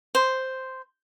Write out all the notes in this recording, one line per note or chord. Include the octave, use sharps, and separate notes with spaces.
C5